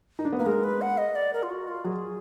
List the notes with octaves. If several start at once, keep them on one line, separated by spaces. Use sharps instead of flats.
D#4
D4
B3
A#3 B4
G#3 A#4
B4
F#5
D#5
D5
A#4
F4
F#4
F4
F#3 G#4